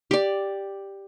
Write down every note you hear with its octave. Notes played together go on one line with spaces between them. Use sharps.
G4 D5